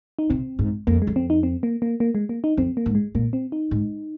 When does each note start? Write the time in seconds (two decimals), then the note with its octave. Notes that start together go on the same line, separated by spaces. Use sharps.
0.19 D#4
0.30 C3 C4
0.59 G#2
0.87 F2 A#3
1.02 G#3
1.07 F2
1.16 C4
1.30 D#4
1.43 C4
1.63 A#3
1.82 A#3
2.00 A#3
2.15 G#3
2.29 A#3
2.44 D#4
2.57 F2 C4
2.77 A#3
2.86 G#2
2.95 G#3
3.15 A#2 A#3
3.33 C4
3.52 D#4
3.71 G#2